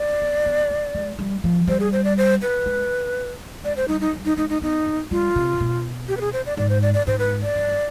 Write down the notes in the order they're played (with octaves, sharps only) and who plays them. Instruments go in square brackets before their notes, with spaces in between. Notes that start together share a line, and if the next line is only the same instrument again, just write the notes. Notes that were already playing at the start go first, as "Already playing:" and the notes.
Already playing: [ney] D5
[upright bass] B3
B3
B3
G#3
G3
F3
[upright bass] G3 [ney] C5
[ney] G#4
C5
D5
C5
B4
[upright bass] G#3
[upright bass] G#3 [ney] D5
[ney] C5
[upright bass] G3 [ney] D#4
[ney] D#4
[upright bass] G3
[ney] D#4
[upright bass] G#3 [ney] D#4
[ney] D#4
[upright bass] B3 [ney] D#4
[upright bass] B3
[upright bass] G3 [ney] F4
[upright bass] C3
B2
[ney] G4
B4
G#4
C5
D5
[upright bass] G#2 [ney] D5
[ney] C5
D5
D5
[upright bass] G#2 [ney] C5
[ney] B4
D5
[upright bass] G2